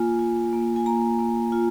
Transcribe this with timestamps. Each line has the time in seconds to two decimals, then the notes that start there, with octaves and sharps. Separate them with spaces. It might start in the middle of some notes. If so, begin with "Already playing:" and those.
Already playing: A#3 F4 G#5
0.19 F4
0.53 A#3
0.76 G#5
0.86 A#3 A#5
1.19 A#3
1.52 F4